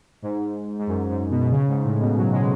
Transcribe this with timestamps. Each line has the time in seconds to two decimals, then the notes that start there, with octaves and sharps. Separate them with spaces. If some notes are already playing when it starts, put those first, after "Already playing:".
0.22 G#2
0.79 G#2
0.87 F#2
1.09 G#2
1.30 B2
1.41 B2
1.51 C#3
1.68 G#2
1.84 A2
2.00 B2
2.17 F#3
2.32 G#3